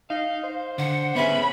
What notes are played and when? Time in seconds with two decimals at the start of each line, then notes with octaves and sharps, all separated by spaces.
0.10 D#4 F5
0.43 C5
0.78 D3 F#5
1.15 B3 C#4 G#4 E5 B5